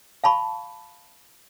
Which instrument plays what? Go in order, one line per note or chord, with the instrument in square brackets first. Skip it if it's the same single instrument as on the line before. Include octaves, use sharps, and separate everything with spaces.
[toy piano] F5 A5 B5 C#6